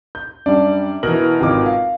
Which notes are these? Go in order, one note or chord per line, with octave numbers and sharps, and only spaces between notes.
G6
F#2 G3 D4 D5
B2 E3 A#4 F#7
G#1 F4 D6
F5